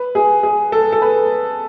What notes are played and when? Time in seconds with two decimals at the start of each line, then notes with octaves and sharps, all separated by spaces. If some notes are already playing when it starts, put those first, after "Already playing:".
Already playing: B4
0.15 G#4
0.43 G#4
0.72 A4
0.92 A4
1.02 B4